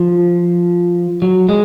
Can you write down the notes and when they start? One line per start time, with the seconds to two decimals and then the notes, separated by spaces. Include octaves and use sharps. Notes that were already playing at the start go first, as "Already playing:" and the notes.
Already playing: F3
1.22 F#3
1.49 G#3